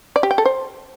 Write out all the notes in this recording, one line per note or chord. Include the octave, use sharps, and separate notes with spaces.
D5
G4
G5
A4
C5